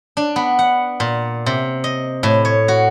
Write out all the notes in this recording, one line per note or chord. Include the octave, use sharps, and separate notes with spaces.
D4
B3
F#5
A#2
C3
D#5
A2
C#5
F#4